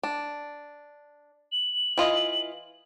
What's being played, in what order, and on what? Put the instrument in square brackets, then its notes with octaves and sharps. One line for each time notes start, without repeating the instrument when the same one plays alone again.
[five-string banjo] D4
[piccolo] F#7
[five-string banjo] E3 F4 D#5